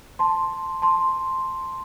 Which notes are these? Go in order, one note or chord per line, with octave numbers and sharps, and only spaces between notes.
A5 C6
A5 C6